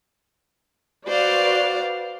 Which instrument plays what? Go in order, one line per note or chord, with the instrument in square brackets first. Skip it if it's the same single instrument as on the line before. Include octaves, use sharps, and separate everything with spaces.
[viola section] F#4 B4 D5 [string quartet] C5 F5